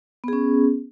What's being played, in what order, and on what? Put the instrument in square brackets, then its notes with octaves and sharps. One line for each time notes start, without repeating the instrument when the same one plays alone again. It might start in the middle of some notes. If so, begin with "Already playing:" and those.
[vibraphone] B3
G#4
C#4